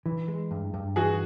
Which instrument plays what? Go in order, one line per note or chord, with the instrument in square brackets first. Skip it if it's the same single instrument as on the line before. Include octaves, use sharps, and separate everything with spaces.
[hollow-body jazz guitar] E3
G#3
G2
G2
[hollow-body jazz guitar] E3 [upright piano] F#4 G#4